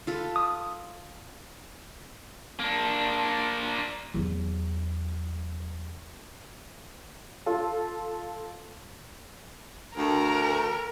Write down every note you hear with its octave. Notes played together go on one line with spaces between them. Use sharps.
F4 A4 B4
D#6
A#3 D4
E2 F#3
F4 A4
D2 A#4